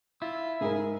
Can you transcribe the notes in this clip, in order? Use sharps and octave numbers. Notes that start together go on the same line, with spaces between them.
E4 F4
G#2 G#4 A#4